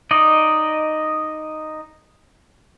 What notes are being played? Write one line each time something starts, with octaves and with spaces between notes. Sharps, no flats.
D#4 D5 D#5